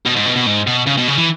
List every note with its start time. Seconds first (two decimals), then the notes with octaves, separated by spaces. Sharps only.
0.06 B2
0.16 G#2
0.26 B2
0.36 B2
0.46 G#2
0.67 B2
0.87 C#3
0.97 B2
1.08 C#3
1.18 E3